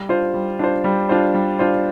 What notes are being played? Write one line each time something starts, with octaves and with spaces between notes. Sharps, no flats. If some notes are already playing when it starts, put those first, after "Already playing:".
Already playing: G3
D4 F4 C5
G3
D4 F4 C5
G3
D4 F4 C5
G3
D4 F4 C5